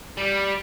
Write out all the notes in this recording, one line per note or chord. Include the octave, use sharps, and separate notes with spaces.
G3